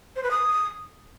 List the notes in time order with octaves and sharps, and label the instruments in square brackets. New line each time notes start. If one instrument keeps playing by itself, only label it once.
[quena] C5
B4
D#6